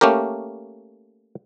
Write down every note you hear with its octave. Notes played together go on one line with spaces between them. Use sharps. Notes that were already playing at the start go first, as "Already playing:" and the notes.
A3 A#3 C#4 G4 A#4